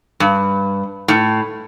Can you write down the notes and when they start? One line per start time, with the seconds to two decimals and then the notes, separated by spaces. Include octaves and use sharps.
0.20 G2
1.08 A2